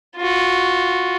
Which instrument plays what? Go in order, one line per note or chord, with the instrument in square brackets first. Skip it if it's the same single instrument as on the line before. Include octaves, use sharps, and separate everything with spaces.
[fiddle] F4 F#4